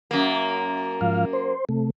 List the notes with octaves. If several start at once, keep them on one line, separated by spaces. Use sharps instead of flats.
F#2 A#3
G#2 F3 F5
C5
C3 A3